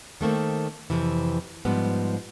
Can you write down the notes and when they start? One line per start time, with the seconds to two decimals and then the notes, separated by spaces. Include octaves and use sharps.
0.21 D#3 A3 A#3 C4
0.90 F2 C3 E3
1.65 G#2 F3 G3 B3